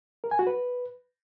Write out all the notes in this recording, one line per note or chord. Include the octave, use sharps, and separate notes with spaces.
A#4
G#5
F#4
B4